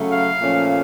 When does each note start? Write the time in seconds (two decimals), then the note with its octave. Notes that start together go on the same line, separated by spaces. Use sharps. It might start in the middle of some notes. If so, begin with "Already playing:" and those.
Already playing: C#3 F#3 A3
0.11 F5
0.40 A#2 F3 A3 C#4